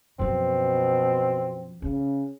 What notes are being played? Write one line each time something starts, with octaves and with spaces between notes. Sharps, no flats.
F#2 B2 F3 C4
C#3 C#4